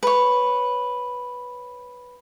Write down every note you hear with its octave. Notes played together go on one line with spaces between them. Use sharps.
B4 C#5